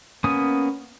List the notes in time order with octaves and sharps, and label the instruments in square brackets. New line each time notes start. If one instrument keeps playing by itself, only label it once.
[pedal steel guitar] A#3 B3 C#4 G#5 D#6